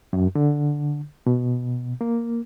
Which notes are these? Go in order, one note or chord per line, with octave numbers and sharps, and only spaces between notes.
F#2
D3
B2
A#3